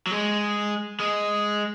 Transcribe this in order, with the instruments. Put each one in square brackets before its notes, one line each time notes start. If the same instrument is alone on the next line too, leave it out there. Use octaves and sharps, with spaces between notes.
[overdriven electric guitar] F#3
G#3
G#3